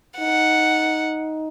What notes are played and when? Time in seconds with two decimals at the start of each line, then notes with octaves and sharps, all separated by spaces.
0.19 D#4 F#5